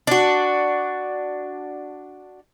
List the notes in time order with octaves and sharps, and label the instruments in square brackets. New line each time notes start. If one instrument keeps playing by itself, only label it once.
[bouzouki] D4 F#4